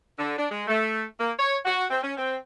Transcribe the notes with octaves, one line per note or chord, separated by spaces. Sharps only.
D3
D4
G#3
A3
A#3
C#5
F#4
C4
C#4
C4